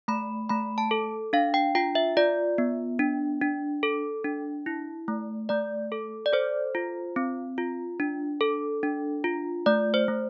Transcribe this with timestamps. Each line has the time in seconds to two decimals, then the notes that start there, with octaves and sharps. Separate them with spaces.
0.08 A3 B5
0.49 A3 B5
0.78 A5
0.91 A4
1.33 D4 F5
1.54 G5
1.75 F4 G5
1.95 E5
2.17 F4 D5
2.58 B3
2.99 D4
3.41 D4
3.83 A4
4.24 D4
4.66 E4
5.08 A3
5.49 A3 D5
5.92 A4
6.26 D5
6.33 A4 C5
6.75 F4
7.16 C4
7.58 F4
8.00 D4
8.41 A4
8.83 D4
9.24 F4
9.66 A3 D5
9.94 C5
10.08 A3